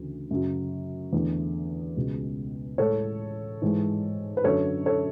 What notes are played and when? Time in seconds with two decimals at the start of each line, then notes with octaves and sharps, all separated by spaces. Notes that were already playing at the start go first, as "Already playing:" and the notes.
Already playing: D2 C#3 E3
0.31 F#2 C#3 F#3
1.13 E2 D3 A3
1.95 C#2 B2 G#3
2.78 A2 G#3 A4 C#5
3.62 G#2 E3 G#3
4.37 B4
4.44 F#2 D3 F#3 A4 C#5
4.86 A4 C#5